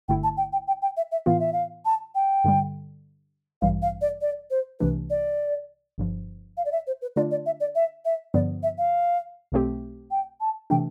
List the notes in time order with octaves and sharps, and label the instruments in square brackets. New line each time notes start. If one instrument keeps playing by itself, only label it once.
[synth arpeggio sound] G1 G2 D3 A3 E4 [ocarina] G5
[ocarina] A5
G5
G5
G5
G5
E5
E5
[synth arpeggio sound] A2 E3 B3 F4 [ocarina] F5
[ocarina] E5
F5
A5
G5
[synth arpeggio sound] G2 D3 G3
[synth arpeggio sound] A1 G2 E3 G3 [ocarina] F5
[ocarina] F5
D5
D5
C5
[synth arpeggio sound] C2 C3 E3 A3 D4 [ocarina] B4
[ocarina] D5
[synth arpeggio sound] G1 G2 F3
[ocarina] F5
D5
E5
C5
B4
[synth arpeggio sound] D3 A3 D4 F4 [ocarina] D5
[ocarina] D5
E5
D5
E5
E5
[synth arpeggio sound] G2 D3 F3 B3 [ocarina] D5
[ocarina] E5
F5
[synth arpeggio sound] B1 B2 A3 C4 G4
[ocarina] G5
A5
[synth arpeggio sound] C3 E3 A3 D4 [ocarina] G5